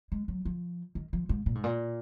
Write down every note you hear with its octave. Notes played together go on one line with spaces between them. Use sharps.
G#3
F#3
F3
D#3
F3
G#2
A#2
G#2
A#2